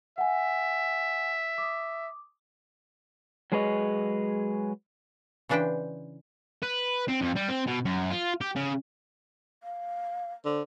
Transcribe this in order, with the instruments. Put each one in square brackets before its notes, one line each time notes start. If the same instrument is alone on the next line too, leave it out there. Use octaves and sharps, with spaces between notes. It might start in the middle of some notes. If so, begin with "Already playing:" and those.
[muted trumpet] E5 [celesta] F#5 G#5
[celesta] D6 D#6
[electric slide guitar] F#3 G#3 G#4 B4 C#5 D#5
[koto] C#3 E3 D4 B4 C5 G5
[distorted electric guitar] B4
C4
F2
G3
C4
B2
F#2
F4
G4
C#3
[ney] F5
[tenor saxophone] D3 [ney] C5